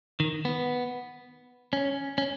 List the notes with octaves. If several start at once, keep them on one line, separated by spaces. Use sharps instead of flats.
D#3
B3
C#4
C#4